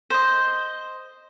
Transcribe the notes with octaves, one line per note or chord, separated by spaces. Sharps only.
C5 D#5